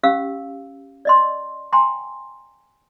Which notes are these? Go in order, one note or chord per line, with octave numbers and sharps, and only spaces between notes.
C#4 G4 F5 E6
D5 D#5 C6
G5 G#5 A#5 C6